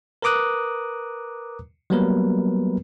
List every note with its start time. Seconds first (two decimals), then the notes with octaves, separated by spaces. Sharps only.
0.22 A#4 B4 A#5 D6 D#6 F#6
1.90 F#3 G3 A#3 B3 A#4 B4